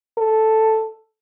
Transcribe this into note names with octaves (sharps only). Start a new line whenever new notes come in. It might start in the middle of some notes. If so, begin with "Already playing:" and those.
A4